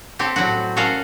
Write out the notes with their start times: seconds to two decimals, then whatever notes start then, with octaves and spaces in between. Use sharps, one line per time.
0.19 C4 G4 A4 C#5
0.36 A2 F#3 G3 F#4
0.77 C#4 F#4 A4 A#4 F5